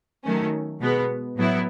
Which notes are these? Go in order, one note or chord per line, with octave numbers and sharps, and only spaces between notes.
D#3 F#3 A3 C#4
B2 G#3 B3
A2 F#3 B3 E4